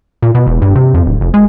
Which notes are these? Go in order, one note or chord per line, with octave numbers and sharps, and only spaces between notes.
A#2
B2
E1
G2
C3
F2
D1
F1
G#3